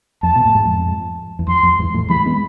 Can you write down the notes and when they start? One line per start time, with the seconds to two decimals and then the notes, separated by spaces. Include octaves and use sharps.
0.23 F2 A5
0.35 B2
0.45 A2
0.55 G#2
0.65 F2
1.39 E2
1.47 F2 C6
1.63 F2
1.79 E2 G#2
1.94 F2 A2
2.09 E3 G#3 B5
2.26 G#3 B3